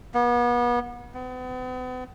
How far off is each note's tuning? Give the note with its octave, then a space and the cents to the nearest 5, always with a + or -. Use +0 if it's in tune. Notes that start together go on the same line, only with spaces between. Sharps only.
B3 -35
B3 +40